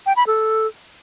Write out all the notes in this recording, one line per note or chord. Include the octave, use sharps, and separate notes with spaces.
G5
B5
A4